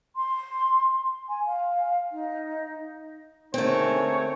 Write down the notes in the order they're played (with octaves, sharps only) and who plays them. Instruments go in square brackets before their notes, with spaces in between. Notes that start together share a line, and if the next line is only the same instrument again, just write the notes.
[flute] C6
G#5
F5
D#4
[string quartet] D3 D#3 G#3 [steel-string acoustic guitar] A3 C4 [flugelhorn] C#5